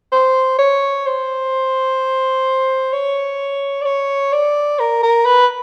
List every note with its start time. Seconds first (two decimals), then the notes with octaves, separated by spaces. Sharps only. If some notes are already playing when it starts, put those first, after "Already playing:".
0.12 C5
0.58 C#5
1.06 C5
2.93 C#5
3.81 D5
3.85 C#5
4.32 D5
4.79 A#4
5.03 A#4
5.25 B4